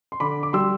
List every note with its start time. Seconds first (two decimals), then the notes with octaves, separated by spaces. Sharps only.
0.12 C6
0.20 D3 B5 D6
0.43 D6
0.53 G3 C6 E6